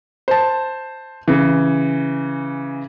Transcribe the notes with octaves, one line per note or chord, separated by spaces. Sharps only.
C5 A5
C#3 E3